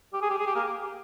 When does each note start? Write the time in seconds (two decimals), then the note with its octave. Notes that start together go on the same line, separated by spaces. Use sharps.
0.14 G4
0.22 G#4
0.30 G4
0.39 G#4
0.47 G4
0.55 A#3